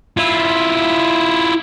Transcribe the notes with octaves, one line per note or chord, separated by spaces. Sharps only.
E4 F4